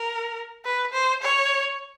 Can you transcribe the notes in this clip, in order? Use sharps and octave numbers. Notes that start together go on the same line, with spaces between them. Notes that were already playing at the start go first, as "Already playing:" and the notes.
Already playing: A#4
B4
C5
C#5